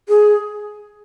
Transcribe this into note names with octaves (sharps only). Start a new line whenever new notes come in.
G#4